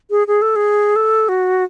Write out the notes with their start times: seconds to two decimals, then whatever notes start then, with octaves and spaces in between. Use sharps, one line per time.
0.10 G#4
0.27 G#4
0.42 A4
0.56 G#4
0.96 A4
1.29 F#4